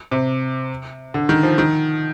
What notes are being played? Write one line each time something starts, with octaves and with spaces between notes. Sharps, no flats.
C3
D3
D#3
F3
D#3